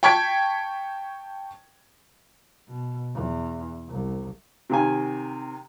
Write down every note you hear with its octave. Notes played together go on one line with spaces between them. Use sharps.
G5 A5 C#6 G#6 B6 D7
B2
E2
C2
C3 D#3 G#5